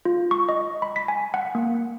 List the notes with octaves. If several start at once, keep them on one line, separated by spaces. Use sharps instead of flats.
F4
C#6
D#5
B5
B6
G#5
F#5
A#3